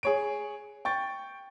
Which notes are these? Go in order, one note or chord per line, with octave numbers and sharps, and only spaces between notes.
G#4 C#5 D7
G5 C#6 A6